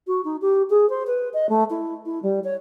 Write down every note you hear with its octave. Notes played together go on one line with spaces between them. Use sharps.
F#4
D#4
G4
G#4
C5
B4
D#5
A3
E4
E4
G3
C#5